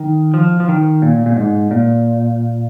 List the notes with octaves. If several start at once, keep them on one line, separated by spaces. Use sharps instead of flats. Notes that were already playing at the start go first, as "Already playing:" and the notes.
Already playing: D#3
F3
F3
D#3
A#2
A#2
G#2
A#2